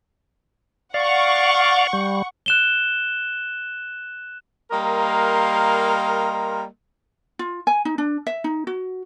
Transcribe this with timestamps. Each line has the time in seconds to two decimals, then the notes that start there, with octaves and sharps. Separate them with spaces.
0.94 D5 F5 F#5 C#6
1.93 G3
2.46 F#6 E7 G7
4.71 G3 A#3 A#4 D#5 F5 C6
7.39 F4
7.67 G#5
7.85 D#4
7.98 D4
8.27 E5
8.44 D#4
8.67 F#4